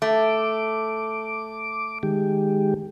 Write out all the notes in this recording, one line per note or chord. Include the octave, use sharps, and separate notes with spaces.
A3 D6
D#3 G#3 G4